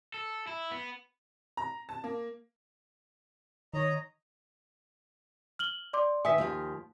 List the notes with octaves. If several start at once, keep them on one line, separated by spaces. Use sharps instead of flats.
A4
E4
B3
A#5
A5
A#3
D#3 C#5 D#5 A#5
F6 F#7 G7
D5 C6 D6
D#3 B4 E5 G#5 D#6 B6
D#2 F3 F5